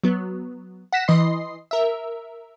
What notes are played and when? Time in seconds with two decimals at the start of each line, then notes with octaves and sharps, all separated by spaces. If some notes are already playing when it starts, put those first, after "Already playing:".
0.04 F#3 B3
0.93 F#5 A#6 B6 E7
1.08 E3 D#5 C6 C7
1.71 A#4 E5